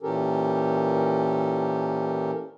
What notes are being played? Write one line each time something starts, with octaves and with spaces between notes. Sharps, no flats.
A#2 E3 C#4 G4 A4 A#4